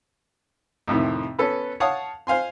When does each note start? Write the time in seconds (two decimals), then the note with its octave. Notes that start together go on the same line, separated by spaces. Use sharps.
0.88 F2 A2 C3 D#3
1.39 B3 C#4 A4 B4
1.80 C#5 F5 F#5 A5 D#6
2.27 C5 F5 G#5 C6